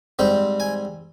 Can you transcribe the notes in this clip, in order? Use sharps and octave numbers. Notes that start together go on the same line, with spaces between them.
G#2 G3 C4 G5
G#5